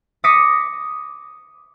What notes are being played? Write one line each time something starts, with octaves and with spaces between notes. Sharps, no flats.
D6 D#6 A#6 B6 C#7 D#7